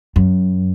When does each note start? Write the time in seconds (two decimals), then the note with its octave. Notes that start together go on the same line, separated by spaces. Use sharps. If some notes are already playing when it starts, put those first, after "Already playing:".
0.16 F#2